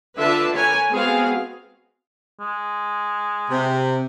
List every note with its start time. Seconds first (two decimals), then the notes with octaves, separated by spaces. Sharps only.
0.16 D3 D4 F4 B4 E5 A5
0.55 A#4 B4 C#5 G#5
0.90 G#3 B3 C4 F#4 G#4 F5
2.40 G#3
3.50 C3